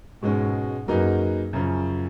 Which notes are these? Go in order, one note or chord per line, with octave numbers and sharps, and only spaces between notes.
G#2 B2 G#3 C#4
F#2 F#3 A#3 D#4 G#4 B4
F#2 C#3 F3